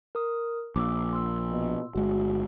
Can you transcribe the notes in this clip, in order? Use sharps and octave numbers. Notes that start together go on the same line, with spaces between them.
A#4 D#6
A#1 D6 E6
C6 E6
B2
G1 G#3 F#4